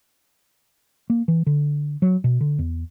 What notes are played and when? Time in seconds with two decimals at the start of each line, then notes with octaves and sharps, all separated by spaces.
1.10 A#3
1.28 E3
1.46 D3
2.02 F#3
2.24 B2
2.41 D3
2.59 E2